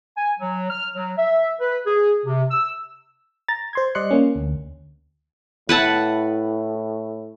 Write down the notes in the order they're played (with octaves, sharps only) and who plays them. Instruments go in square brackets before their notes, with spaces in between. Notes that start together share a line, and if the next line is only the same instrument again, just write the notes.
[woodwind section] G#5
F#3
F6
F#3
E5
B4
G#4
C3
E6
[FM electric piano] A#5 A6
C5 C6 G#6
G3 D5 D#5 C6 F#6 C#7
A#3 C#4
D2
[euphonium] A2 [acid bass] E4 [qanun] B4 F#5 A5